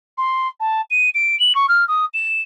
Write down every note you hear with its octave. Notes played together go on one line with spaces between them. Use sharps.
C6
A5
D#7
D7
F#7
C#6
F6
D#6
E7